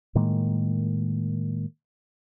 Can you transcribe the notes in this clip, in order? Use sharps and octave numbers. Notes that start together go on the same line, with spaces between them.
A2 D#3 G#3 A#3